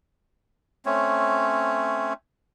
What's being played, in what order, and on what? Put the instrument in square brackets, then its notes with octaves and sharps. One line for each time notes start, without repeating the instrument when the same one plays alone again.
[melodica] A3 C4 C#4 C#5